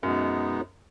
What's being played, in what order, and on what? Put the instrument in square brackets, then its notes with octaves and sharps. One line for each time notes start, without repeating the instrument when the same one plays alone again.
[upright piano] F#2 [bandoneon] B2 G#3 B3 D#4